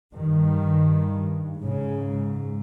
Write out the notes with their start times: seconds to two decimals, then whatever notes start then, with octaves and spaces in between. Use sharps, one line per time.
0.14 G2 D#3
1.62 G#2 C#3